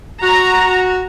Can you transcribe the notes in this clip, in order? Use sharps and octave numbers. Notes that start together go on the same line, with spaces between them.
F#4 A#5